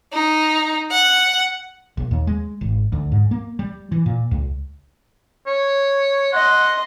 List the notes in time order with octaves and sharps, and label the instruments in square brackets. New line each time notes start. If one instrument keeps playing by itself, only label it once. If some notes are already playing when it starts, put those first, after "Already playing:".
[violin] D#4
F#5
[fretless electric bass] A#1
D#2
G#3
G#1
D2
G#2
A#3
G3
E3
A#2
C#2
[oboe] C#5
[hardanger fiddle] D#5 C6 [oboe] F#5